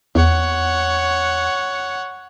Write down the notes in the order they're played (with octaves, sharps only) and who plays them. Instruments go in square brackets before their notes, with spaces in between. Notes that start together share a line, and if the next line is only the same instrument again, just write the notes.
[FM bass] E2 [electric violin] C#5 F#5